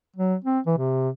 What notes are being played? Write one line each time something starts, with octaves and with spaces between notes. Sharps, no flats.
F#3
C4
E3
C3